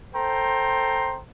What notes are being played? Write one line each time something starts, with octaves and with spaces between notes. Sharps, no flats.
A4 C5 G5 A#5 C6